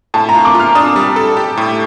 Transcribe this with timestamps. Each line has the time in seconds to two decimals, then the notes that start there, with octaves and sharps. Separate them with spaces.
0.14 A2 A5
0.29 A#5
0.34 F4
0.45 D6
0.55 F4 F6
0.75 D4 D#6
0.96 G3
1.16 A4
1.37 G4
1.57 A2